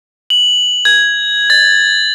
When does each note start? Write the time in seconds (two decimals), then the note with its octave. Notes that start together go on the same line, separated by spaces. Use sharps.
0.30 F#7
0.85 G#6
1.50 A6